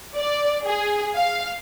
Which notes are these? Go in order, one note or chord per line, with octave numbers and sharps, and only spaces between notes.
D5
G#4
F5